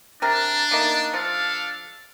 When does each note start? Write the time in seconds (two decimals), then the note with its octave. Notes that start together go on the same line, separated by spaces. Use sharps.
0.22 C3 D4 A#4
0.71 A3 A#3 D#4
1.13 F3 D4 A4 F5